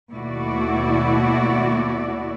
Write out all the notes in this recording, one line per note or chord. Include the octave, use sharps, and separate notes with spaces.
D#2 B2 A3 E4 F#4 D5